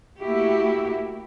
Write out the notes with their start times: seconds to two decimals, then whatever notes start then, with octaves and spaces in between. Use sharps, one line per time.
0.19 A3 A#3 E4 F#4 G4